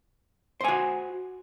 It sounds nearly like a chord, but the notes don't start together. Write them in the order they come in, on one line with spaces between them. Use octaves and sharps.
C5 G#5 F#4